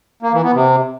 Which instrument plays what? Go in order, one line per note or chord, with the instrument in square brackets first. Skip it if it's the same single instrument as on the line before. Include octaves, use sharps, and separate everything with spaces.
[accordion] A#3
E3
B3
C3